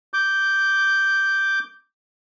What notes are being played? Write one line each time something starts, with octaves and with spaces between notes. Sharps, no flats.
D6 G6